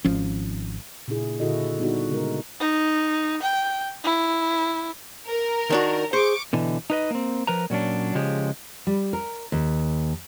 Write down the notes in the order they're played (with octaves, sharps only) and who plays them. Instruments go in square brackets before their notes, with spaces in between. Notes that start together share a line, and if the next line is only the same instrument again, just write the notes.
[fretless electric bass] G#1 F3 C#4
[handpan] A#2 C#3 D4 E4 G#4
A#2 D3 E4 F#4 A4 D#5
G3 B3 D4 D#4 F#4
C#3 G#3 A#4
[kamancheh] D#4
G5
E4
[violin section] A#4
[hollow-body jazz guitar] D#3 D4 F#4
[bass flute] G#4 [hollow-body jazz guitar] C5 [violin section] C#6 D6
[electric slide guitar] B2 D3 E3
D#4 B4 D#5
A#3 C4
F3 A#4 B4 A#5
A#2 F#3 C#4 D4
C#3 F3 G#3 G4
[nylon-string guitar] G3
A#4
D#2